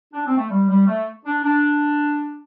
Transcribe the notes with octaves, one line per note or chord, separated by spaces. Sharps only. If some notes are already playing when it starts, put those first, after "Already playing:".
D4
C4
A3
G3
G3
A3
D4
D4